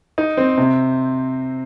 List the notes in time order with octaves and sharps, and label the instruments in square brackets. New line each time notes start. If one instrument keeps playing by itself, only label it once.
[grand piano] D#4
C4
C3